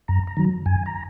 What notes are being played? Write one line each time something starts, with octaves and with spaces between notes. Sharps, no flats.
F#2 A#5
A#5
D#3 F#3
F#2 G#5
A#5